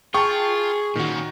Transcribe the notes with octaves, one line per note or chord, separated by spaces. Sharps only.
F4 G#4 G5 A5 C#6
A#2 D#3 C#4 F#4